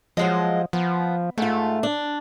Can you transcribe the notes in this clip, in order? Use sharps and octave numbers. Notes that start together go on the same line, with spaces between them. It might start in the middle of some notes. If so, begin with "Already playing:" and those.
F3 F#3 G#3 D#5
F3 B3
G#2 A3 F4
D4